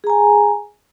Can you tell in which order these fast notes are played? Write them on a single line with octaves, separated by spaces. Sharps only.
G#4 A#5 G#5